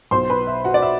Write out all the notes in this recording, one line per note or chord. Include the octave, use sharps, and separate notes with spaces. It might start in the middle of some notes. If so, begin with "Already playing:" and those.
B1 B2 C5 C6
B4 B5
E5
F#4 F#5
D5
E5